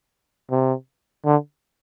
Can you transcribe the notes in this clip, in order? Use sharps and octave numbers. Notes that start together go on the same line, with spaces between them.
C3
D3